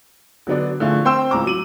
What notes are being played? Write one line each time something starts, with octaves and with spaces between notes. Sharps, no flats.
D3 F#3 B3 D4
A2 D3 F3 A3 F4 G#4
C4 C5 G5 C6 E6 E7
C#2 A2 A#5 D6
F#3 D#7 F#7